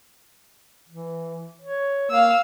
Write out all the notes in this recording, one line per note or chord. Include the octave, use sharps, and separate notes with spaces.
E3
C#5
A#3 F5 E6